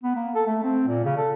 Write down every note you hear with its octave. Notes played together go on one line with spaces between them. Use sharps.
B3
A#3
A4
A3
C4
A#2
C#3
A4